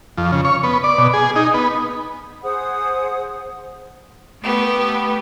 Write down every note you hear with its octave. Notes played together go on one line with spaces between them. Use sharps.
F2
C#3
C#5
B3
D5
B2
G#4
D#4
B3
G#4 C5 F#5 D#6
A3 B3 G4